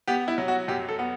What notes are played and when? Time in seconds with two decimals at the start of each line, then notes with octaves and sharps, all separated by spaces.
0.07 B3 G4
0.28 E4
0.38 F#3
0.48 F#4
0.68 F#2 G4
0.89 A4
0.99 B3